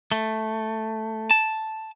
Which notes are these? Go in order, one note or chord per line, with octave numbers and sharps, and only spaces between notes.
A3
A5